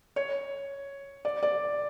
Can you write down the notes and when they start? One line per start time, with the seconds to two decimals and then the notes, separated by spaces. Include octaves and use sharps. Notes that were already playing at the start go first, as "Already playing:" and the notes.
0.16 C#5
1.25 D5
1.43 D5